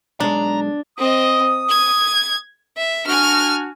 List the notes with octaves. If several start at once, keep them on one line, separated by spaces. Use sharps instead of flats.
B1 G#3 D4 A#5
C4 D#5 D#6
G#6
E5
D4 F#4 G#5 F6